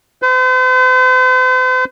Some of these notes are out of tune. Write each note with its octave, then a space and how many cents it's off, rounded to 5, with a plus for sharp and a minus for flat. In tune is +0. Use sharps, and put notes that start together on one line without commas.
C5 -45